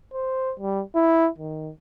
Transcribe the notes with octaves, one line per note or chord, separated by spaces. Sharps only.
C5
G3
E4
D#3